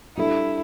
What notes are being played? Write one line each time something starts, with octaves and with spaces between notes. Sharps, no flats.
G3 D4 E4 A4